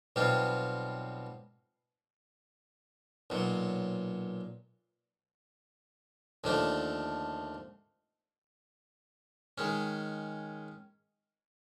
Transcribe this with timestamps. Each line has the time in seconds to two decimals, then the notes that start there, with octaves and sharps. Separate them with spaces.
0.16 B1 B2 G3 C4 F4
3.30 B1 A#2 F#3
6.44 D#2 D3 F3 A3 D4
9.58 D#3 G#3 C#4